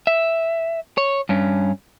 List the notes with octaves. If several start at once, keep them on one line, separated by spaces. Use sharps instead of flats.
E5
C#5
G2 C#4